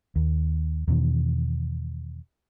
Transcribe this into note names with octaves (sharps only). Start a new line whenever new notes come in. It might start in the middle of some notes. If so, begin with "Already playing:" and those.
D#2
E2 B2 D#3